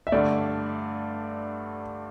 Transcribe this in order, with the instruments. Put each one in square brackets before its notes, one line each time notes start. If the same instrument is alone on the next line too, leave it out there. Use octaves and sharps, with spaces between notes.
[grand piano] E5
[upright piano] G2 D3 A3 [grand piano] D5